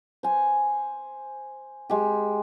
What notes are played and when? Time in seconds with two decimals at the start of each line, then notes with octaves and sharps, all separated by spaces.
0.23 C5 G#5
1.90 G#3 G4